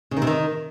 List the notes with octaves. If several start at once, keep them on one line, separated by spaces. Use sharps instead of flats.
C#3
D#3
C3
D#3